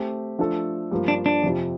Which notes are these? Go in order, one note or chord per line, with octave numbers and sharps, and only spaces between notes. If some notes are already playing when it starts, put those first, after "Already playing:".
Already playing: A3 C4 G4
F3 A3 D4 A4
G2 F3 A#3
D4
D4
F2 C3 F3